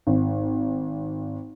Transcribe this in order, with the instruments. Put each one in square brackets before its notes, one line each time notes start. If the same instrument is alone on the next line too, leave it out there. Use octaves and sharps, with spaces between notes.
[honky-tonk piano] G#1